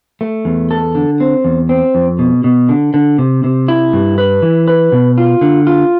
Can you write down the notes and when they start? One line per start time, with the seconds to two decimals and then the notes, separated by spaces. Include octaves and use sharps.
0.21 A3
0.45 E2
0.71 A4
0.95 D3
1.20 C4
1.44 E2
1.69 C4
1.95 F2
2.19 B2
2.44 B2
2.69 D3
2.94 D3
3.18 C3
3.44 C3
3.68 E4
3.93 G2
4.18 B4
4.42 E3
4.68 B4
4.92 B2
5.18 F4
5.41 D3
5.67 F4